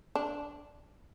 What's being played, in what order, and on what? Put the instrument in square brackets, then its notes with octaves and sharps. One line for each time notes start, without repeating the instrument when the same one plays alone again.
[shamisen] D4